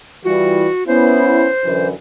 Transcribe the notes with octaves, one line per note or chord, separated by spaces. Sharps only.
E3 G3 F4 F#4
B3 C#4 E4 C5
F#2 D3 E3